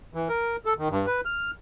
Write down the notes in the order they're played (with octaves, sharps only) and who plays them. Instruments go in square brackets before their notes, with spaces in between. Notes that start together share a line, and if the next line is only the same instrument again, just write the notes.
[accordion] E3
A#4
A4
D#3
G2
B4
F6